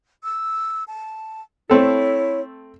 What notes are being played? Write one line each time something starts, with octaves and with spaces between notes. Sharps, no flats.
E6
A5
A3 C4 E4 A4 C#5